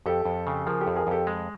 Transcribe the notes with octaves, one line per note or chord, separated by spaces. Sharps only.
F2 G4 A4
F2
C#3
F3 G#4 A#4
G4 A4
F2
G#4 A#4
F2 G4 A4
G#3